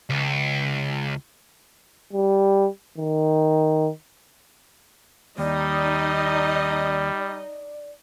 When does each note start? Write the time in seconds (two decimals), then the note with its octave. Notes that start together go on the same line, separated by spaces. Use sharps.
0.10 C#2
2.13 G3
2.98 D#3
5.38 D#2 G3 D#4 D5 D#5